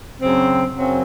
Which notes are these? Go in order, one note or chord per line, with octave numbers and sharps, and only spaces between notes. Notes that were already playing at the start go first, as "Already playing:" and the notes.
F#2 C#3 F#3 C4
F#2 C#3 F#3 C4